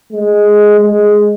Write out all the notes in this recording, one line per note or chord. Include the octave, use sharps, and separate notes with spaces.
G#3
G#3